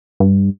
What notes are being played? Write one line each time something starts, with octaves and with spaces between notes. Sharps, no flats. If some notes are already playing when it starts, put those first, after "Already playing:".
G2